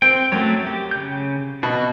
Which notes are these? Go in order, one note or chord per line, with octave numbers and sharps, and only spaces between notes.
C4 G5
F#2 F#3 A3 C#5
G4
C#3 G6
B2 F#4